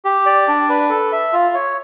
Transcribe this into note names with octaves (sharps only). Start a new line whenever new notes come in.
G4
D5
D4
B4
A4
E5
F4
C#5